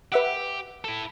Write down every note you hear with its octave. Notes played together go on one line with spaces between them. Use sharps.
G4 B4 E5 F#5
E4 A4